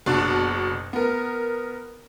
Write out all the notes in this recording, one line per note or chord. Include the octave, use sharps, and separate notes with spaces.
F#1 B2 D4 F#6
B3 A#4